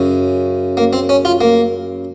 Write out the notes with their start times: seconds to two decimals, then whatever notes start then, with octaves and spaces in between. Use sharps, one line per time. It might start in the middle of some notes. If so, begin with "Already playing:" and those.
Already playing: F#2 C#3
0.77 A#3
0.93 C4
1.09 C#4
1.25 F4
1.41 A#3